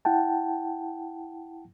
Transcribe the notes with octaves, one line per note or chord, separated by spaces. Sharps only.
E4 F#5 G5 A5